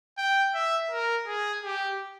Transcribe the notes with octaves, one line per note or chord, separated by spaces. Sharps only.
G5
E5
A#4
G#4
G4